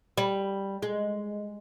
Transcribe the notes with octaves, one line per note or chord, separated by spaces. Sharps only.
G3
G#3